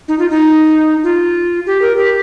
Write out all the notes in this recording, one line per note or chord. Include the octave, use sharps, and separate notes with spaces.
D#4
F4
D#4
F4
G4
A#4
G4